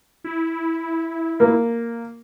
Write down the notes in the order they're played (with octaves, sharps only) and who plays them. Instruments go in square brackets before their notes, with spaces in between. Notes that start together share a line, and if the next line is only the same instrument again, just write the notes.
[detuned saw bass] E4
[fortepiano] A#3